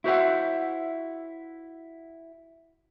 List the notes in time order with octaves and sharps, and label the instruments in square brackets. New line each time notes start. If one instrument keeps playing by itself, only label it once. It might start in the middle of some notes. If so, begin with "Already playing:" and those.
[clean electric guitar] E4 F#4 C5 C#5 E5 F#5